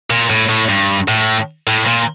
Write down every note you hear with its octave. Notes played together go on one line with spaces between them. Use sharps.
A#2
A2
A2
G2
A2
A2
A#2